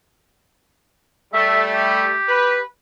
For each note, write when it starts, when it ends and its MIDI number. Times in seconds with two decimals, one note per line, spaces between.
1.33 2.16 55
1.33 2.16 57
1.33 1.62 76
1.75 2.60 67
2.28 2.61 71